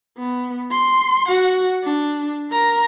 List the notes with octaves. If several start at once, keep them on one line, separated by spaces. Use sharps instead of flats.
B3
C6
F#4 F#5
D4
A#4 A#5